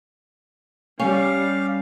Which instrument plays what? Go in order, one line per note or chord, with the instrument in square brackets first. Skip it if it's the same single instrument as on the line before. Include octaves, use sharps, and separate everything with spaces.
[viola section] G3 [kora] C#4 [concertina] F5